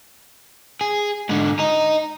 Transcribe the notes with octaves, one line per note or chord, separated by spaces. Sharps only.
G#4
G#2 D3
D#5 A#5